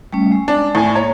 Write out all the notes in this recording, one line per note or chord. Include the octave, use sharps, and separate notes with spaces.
G3 A3 C#4
G#3
D4
A2 G#5
A#3 C#5